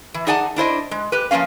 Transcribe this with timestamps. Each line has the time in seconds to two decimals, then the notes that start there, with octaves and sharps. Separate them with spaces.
0.14 E3
0.27 D#4 G#4 D5 F#5 G5 A5
0.56 D4 E4 C5 D#5
0.91 G#3
1.12 G4 B4
1.31 F3 G3 A#3 C#4 F5